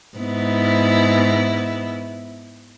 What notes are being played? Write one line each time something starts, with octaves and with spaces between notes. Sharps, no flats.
G#2 B3 E4